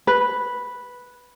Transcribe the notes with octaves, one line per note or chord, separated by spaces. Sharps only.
B4